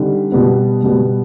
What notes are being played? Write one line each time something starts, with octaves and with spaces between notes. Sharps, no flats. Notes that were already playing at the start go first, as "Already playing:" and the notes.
Already playing: D3 G3 C4 D#4
B2 G3 B3
B2 G3 B3